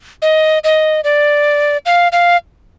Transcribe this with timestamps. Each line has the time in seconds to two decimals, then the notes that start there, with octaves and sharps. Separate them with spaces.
0.22 D#5
0.64 D#5
1.04 D5
1.86 F5
2.12 F5